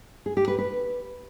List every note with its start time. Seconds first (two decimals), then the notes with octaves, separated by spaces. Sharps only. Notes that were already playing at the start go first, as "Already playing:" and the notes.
0.26 G#4
0.37 G4
0.48 B4
0.59 B4